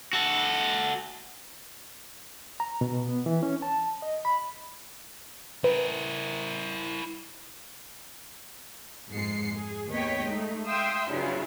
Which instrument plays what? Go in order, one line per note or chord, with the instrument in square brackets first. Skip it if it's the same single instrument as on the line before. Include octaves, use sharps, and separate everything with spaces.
[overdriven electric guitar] F#4 A4
[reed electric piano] A#5
B2
B3
E3
C#4
A5
D#5
B5
[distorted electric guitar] E4 A#4 [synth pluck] B4
[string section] F2 G#2 G#3 C7 C#7
G#4
D#2 B3 C#5 D#5 G5 B6
G#3 A3 D#4
E5 F5 G5 C6 D#6 E6
G2 C#3 F#3 C#4 E4 F4